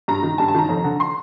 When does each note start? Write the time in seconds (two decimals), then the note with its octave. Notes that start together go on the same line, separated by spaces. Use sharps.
0.08 G2 A#5
0.23 D#3
0.38 G2 A5
0.48 A5
0.55 D#3 A#5
0.69 F2
0.84 D3
1.00 C6